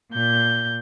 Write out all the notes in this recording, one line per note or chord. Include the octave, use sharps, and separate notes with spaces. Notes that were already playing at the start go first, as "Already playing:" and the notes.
A#2 G6